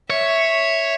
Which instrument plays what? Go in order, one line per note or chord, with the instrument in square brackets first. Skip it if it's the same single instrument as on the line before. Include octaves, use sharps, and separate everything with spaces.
[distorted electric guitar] C#5 [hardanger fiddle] E5